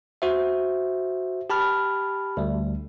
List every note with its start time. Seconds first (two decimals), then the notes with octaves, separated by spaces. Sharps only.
0.22 F#4 C5 E5
1.50 G4 A5 B5 F6
2.37 D2 G3